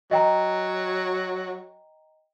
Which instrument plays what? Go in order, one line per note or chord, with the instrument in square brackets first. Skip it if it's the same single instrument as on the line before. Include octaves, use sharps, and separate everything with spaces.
[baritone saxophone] F#3 [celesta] D#5 G5 A#5